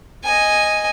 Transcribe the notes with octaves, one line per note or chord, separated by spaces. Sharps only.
D#5 G#5